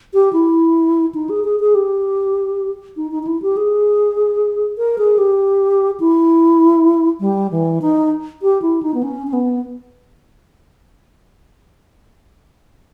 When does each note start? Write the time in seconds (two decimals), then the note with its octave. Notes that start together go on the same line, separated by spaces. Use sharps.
0.14 G4
0.33 E4
1.15 D#4
1.29 G#4
1.44 G#4
1.60 G#4
1.75 G4
2.97 D#4
3.11 D#4
3.23 D#4
3.27 E4
3.42 G4
3.57 G#4
4.78 A#4
4.98 G#4
5.18 G4
6.00 E4
7.20 G3
7.51 E3
7.82 D#4
8.42 G4
8.62 E4
8.83 D#4
8.94 B3
9.03 C#4
9.27 C#4
9.33 B3